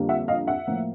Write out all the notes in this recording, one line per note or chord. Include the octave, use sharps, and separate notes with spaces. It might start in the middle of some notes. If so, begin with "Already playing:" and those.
Already playing: F2 D3 G3 A#3
E5 F#5
D#5 F5
E5 F#5
A2 F3 A#3